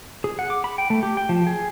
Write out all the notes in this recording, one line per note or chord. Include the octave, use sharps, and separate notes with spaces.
G#4
F#5
D6
B5
G5
A3
G4
G5
F3
G#4